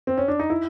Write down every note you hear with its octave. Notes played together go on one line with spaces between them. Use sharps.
C4
C#4
D4
D#4
E4